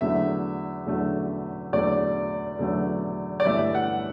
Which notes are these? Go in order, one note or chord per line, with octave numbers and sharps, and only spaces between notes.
E2 D3 F#3 A3 E5
E2 D3 F#3 A3
E2 D3 F#3 A3 D5
E2 D3 F#3 A3
D5
G1 G2 E3 A3 E5
F#5